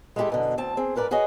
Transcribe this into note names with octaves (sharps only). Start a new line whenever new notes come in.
G#3 A3 E4 F#4 G4 A4
F#2 B2 D3
D2 C4 A5
C4 G#4
G#2 A#4 B4 D5
F#4 G#4 B4 C#5 D#5